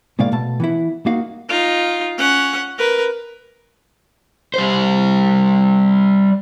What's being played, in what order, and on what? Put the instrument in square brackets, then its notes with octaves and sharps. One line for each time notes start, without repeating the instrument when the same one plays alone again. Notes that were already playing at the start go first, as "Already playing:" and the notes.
[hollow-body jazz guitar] A2 C3 G#3 A#3 D5 F5
B2 A3 A5
E3 B3 E4
A#3 D#4 F#4 F5
[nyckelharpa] D#4 F4
C#4 F#5
A#4 B4
[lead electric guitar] G3 C5